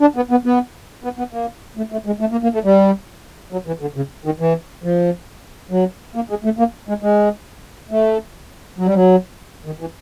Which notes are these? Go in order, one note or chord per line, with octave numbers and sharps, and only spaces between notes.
D4
B3
B3
B3
B3
B3
A#3
A3
A3
G#3
A3
A#3
A#3
A3
G3
F#3
E3
D3
C#3
D#3
E3
F3
F#3
A#3
G#3
A3
A#3
G#3
G#3
A3
F#3
G3
F#3
D#3
E3